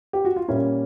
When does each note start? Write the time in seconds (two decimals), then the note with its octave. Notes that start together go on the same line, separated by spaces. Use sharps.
0.13 G4
0.25 F#4
0.36 F4
0.48 A#2 G3 A#3 C#4 E4